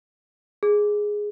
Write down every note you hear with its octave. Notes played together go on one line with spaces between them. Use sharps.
G#4